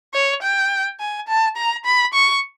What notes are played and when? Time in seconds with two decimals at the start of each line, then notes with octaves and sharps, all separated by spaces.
0.14 C#5
0.42 G5
1.00 G#5
1.28 A5
1.57 A#5
1.85 B5
2.14 C#6